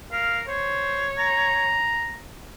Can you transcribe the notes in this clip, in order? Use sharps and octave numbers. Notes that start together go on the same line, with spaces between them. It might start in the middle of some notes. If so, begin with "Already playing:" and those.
A#4 F5
C5 C#5
A#5